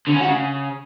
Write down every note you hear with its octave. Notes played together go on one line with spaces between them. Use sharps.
D3
C#4
F#4
C#3